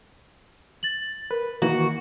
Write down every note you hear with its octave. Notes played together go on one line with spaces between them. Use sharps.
A6 F#7
A#4 B4 B5
D#3 E3 A#3 F#4